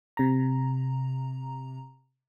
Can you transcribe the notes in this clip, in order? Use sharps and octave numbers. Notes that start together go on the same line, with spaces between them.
C3 A#5